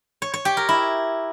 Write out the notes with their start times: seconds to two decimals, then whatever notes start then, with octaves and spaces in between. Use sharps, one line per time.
0.22 C#5
0.34 C#5
0.45 G4
0.57 A#4
0.69 E4